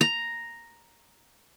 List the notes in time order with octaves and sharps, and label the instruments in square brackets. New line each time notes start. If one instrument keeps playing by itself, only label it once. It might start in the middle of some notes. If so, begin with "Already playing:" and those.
[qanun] A#5